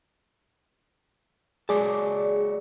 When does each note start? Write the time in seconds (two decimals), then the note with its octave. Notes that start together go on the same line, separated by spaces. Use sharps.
1.69 F#3 G#3 G#4 D5 A5